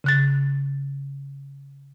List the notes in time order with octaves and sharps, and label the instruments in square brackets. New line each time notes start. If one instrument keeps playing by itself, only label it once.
[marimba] C#3 F#6 A6